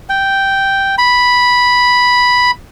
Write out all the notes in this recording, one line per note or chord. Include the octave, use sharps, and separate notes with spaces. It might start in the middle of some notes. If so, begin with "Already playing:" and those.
G5
B5